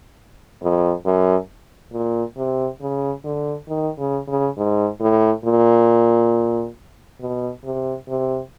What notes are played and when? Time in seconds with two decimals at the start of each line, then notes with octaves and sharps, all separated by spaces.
0.62 F2
1.06 F#2
1.93 A#2
2.37 C3
2.82 C#3
3.25 D3
3.69 D#3
3.99 C#3
4.28 C#3
4.58 G#2
5.01 A2
5.45 A#2
7.20 B2
7.64 C3
8.09 C3